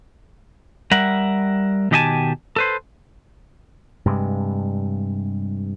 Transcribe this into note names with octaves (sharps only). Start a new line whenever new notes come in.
G3 A#4 E5 F#5
B2 D#3 G4 D#5 G#5 A5
A4 B4 C5
G2 C3 G#3